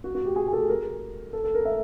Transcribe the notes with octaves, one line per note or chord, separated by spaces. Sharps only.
F#4
F#4
G4
G#4
G#4
A4
A#4
A4
A4
A#4
E5